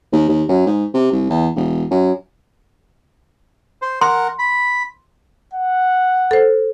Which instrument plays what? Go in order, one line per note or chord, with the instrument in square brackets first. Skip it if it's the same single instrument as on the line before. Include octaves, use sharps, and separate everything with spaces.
[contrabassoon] D#2
D#2
F#2
G#2
C3
C2
E2
E1
F#2
[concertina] C5
[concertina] A#4 F#5 [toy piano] C6
[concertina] B5
[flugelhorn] F#5
[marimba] A4 C5